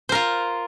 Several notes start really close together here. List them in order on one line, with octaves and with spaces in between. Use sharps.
C5 A#4 F4